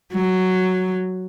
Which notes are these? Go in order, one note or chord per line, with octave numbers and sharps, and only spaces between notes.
F#3